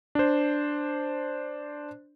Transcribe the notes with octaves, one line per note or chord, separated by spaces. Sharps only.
D4 C5